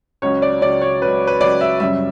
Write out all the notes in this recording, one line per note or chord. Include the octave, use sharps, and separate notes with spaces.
C#2 C#3 F#3 C#5
D5
C#2 C#3 F#3 D5
C#5
C#2 C#3 F#3 B4
B4
C#2 C#3 F#3 D5
E5
F#2 C#3 G3 E5